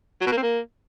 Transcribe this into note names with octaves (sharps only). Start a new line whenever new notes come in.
F#3
B2
A#3
C4
A#3